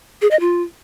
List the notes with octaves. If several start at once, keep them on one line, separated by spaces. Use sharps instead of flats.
G#4
D#5
F4